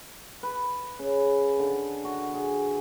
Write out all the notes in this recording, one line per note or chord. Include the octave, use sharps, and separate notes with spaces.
B4
C#3
D3
F#4
G#4